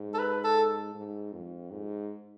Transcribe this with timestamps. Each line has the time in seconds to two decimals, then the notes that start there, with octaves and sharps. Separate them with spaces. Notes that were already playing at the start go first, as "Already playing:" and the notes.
Already playing: G#2
0.14 A4
0.19 B4
0.44 A4
0.95 G#2
1.33 F2
1.71 G#2